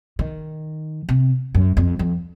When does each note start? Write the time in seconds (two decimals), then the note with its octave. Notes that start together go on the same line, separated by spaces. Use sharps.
0.19 D#3
1.09 C3
1.55 F#2
1.77 F2
1.99 F2